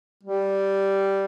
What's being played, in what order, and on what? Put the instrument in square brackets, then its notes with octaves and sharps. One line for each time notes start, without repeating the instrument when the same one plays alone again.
[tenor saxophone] G3